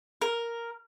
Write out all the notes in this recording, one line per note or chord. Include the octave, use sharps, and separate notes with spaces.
A#4